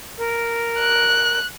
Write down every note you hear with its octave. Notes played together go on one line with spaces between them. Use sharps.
A#4
F#6